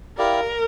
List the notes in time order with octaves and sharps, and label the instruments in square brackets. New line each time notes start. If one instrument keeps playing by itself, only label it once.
[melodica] E4 G4 D5 F5 [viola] A#4